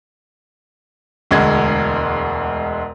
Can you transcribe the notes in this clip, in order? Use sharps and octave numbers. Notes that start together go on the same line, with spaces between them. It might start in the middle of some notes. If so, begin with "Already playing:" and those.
E1 D2 G#3 G#6